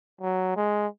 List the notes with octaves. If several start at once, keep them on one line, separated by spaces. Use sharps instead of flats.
F#3
G#3